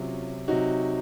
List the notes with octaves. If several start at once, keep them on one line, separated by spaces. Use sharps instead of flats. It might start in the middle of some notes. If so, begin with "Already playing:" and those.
Already playing: C3 F#3 C#4 F4
C3 F#3 D#4 F#4